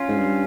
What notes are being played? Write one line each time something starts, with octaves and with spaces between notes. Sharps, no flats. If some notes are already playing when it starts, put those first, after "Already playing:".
Already playing: C#4 F4
G#2
G2